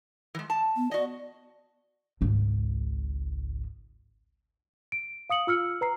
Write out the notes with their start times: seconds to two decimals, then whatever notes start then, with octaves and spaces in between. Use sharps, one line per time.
0.35 E3 G#3
0.50 A5
0.76 B3
0.91 F#4 D5 D#5
2.21 G#1 C#2
4.92 D7
5.30 F5 D#6 C#7 F#7
5.47 F4 E6 F6 C#7
5.81 B4 A#5 C7